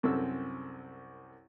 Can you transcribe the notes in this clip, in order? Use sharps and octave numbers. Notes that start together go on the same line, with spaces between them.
C2 F#2 C4 A4 E6